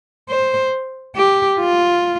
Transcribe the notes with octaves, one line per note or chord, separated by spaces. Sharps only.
C5
G4
F4